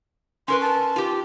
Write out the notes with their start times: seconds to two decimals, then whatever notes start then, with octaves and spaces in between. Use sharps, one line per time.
0.48 C#4 A#4 B4 C6
0.62 A5
0.96 F4 G4